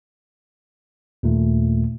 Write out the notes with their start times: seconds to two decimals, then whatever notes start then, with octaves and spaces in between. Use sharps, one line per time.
1.23 D#2 A#2 A3